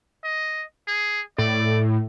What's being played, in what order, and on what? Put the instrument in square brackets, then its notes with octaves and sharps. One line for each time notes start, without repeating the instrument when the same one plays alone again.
[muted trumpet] D#5
G#4
[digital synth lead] A2 [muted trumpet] D5